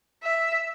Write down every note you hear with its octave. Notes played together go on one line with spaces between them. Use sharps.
E5